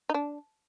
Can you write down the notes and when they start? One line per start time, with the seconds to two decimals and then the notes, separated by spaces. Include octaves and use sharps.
0.09 D#4
0.14 D4